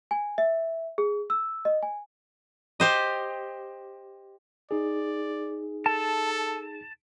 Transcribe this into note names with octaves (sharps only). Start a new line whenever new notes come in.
G#5
E5
G#4
E6
D#5
G#5
G4 C5 D#5
D#4 G#4 D5
A4 A5